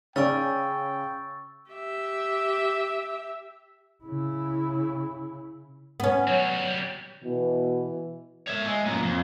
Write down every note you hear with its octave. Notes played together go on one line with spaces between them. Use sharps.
C#3 C#4 D5 G5 C#6 E6 A6
G4 E5
C#3 E4
B3 C#4
F#3 G3
B2 E3
C#5 E5
G#3
F#2 A#2
F2